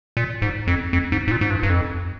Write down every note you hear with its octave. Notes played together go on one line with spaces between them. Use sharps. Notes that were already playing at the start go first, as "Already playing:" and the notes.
A#2
G#2
F2
F2
G#2
G#2
A#2
G#2
G2
G2
F2